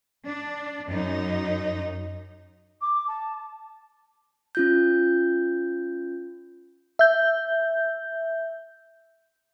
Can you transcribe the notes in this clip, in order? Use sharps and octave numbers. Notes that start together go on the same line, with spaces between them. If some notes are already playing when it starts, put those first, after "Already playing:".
D4
F#2 D#4
D6
A5
C#4 F4 G6
E5 G6